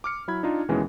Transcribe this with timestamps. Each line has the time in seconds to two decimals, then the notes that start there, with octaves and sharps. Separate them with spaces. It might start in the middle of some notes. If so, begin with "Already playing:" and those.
0.04 D6 F6 C#7
0.28 F#3 E4 B5 G#6
0.43 D4 D#4 F4
0.68 D#2 B2 E3 G#3 C#4